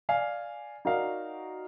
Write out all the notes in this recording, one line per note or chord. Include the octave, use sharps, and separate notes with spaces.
D5 F5 G#5
D#4 F#4 A#4 D5 F5